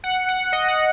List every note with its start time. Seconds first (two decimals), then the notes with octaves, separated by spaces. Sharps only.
0.04 F#5
0.29 F#5
0.53 D#5
0.68 F#5